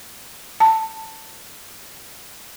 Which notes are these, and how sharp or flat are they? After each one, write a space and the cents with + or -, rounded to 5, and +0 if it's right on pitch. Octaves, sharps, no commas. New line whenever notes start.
A5 +15